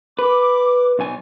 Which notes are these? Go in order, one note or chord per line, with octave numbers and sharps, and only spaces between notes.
B4 D6
B1 G#5